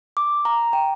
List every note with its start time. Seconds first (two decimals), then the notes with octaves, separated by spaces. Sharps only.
0.17 D6
0.45 A#5
0.73 G5